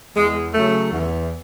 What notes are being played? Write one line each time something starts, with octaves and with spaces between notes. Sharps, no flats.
E2 G#3
C#3 F#3 A3
E2